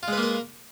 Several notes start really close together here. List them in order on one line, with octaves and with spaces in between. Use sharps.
F4 G#3 B4 A#3 A#4